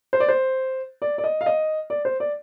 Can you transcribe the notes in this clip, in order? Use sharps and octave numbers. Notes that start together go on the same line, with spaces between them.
C5
D5
C5
D5
D5
D#5
F5
D#5
D5
C5
D5